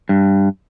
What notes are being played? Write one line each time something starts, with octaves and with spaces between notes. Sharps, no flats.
G2